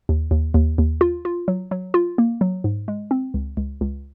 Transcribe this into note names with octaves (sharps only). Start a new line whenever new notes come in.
D#2
D#2
D#2
D#2
F4
F4
F#3
F#3
F4
A#3
F#3
G#2
G#3
C4
C#2
C#2
C#2